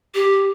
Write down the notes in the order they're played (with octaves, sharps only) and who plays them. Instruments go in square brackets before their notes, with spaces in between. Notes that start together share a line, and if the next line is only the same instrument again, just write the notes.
[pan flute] G4